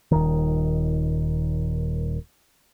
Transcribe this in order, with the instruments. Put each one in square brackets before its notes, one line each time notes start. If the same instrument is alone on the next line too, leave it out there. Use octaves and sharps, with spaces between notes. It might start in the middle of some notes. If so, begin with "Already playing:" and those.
[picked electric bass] D#1 D#3